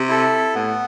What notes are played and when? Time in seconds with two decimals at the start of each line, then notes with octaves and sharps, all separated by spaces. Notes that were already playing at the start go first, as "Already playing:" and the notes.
Already playing: C3
0.09 E4 A4
0.55 A2 B3